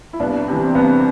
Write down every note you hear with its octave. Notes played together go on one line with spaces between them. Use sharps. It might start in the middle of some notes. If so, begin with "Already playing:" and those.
E4
C2 B3 D4
C3 E3
C4
C2 B3 D4